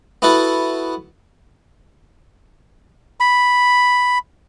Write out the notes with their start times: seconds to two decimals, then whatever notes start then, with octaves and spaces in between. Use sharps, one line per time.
0.22 B3 E4 F#4 A4 B4
3.20 B5